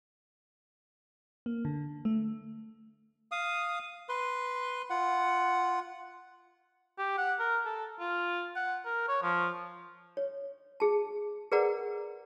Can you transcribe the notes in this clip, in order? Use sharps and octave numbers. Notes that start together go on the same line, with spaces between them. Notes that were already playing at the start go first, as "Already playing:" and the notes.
A#3
D3
A3
F5 D#6
B4 C6
F4 F#5
G4
F#5
A#4
A4
F4
F#5
A#4
C#5
F3
C#5
G#4 A5
G#4 A#4 B4 D5 F#5 A#5